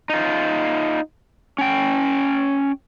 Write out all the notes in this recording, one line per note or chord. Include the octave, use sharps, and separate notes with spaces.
D#4 F4
C#4 G5